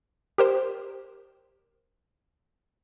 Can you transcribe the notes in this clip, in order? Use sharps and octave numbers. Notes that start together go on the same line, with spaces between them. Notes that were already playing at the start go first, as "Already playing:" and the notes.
G4 A#4 C5